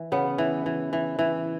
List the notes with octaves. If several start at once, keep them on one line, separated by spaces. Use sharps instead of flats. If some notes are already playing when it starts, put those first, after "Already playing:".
Already playing: E3
C#3 B3
E3
E3
E3
E3